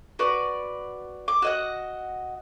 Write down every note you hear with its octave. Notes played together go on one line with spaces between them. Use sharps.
F#4 B4 D5
D6
F#4 D#5 F#5